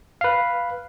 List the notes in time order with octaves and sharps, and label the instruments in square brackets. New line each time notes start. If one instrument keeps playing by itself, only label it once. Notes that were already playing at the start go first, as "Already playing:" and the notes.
[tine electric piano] B4 F5